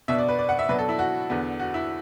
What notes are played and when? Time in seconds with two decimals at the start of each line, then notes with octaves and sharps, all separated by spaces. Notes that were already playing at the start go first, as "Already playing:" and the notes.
0.08 B2 B3 D4 E5
0.18 D5
0.29 B4
0.39 D5
0.49 F#5
0.59 E5
0.69 B2 F#3 D4 B4
0.79 A4
0.89 E4
0.99 F#4
1.30 E2 D3 B3
1.59 F#4
1.74 E4